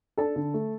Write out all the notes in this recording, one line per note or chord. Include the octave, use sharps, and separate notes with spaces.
D4 A4 A5
D3
A3